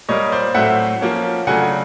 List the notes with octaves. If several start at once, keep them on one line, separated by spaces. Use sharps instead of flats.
A#2 G3 A#3 C#5 D#5
C5 D5
A2 F#3 A3 C4 E5 F#5
F3 A#3 C#4
C#3 F#3 A3 D4 F#5 G#5